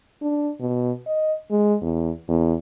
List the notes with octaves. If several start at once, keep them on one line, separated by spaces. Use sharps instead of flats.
D4
B2
D#5
G#3
E2
E2